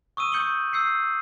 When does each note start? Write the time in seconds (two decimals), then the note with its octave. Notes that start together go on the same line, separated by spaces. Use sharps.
0.17 C#6 D#6 E6 D#7
0.32 C#6 D#6 G6 C#7 F#7 G7
0.73 E6 G6 C7 C#7